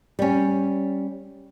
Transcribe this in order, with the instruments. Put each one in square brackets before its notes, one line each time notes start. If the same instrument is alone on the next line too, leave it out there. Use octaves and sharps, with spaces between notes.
[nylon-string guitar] G3 C#4